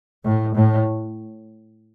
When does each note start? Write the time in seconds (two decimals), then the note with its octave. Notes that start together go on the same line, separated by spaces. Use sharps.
0.24 A2
0.55 A2